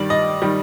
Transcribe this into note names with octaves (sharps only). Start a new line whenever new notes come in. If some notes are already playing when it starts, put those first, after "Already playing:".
Already playing: G2 D#3 G3 D5
D#5
D#3 G3